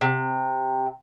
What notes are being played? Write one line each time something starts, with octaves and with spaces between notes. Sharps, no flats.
C3